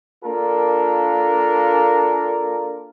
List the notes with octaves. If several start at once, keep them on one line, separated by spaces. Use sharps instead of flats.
A#3 D4 F4 A4 A#4